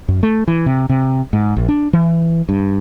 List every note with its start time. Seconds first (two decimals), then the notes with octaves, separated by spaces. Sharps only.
0.08 F#2
0.23 A3
0.48 E3
0.66 C3
0.89 C3
1.33 G#2
1.57 A#1
1.69 D4
1.93 E3
2.49 G2